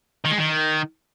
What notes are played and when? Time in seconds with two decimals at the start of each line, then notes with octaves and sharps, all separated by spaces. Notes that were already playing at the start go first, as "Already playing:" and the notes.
0.25 D#3
0.31 G#3
0.38 D#3